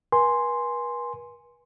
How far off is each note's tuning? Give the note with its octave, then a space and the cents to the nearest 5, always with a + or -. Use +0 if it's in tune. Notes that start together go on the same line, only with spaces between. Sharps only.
B4 -45 G#5 +0 C6 +0